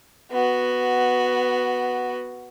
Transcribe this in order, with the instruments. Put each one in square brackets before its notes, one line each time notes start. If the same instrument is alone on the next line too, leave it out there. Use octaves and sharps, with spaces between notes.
[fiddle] B3 F#4